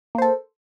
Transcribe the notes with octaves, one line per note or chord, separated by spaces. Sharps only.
A#3 A4 C5